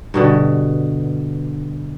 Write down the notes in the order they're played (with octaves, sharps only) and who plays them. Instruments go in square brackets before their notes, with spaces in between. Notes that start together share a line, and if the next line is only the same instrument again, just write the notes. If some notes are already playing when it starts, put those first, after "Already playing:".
[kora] G2 B2 D3